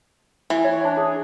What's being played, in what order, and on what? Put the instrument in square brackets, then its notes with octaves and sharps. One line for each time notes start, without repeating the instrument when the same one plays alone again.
[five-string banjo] E3
[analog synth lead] C#5
D4
G#4